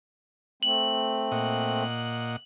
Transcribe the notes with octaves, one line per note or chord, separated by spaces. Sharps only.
A3 C4 F#7
A#2 D#5 F#5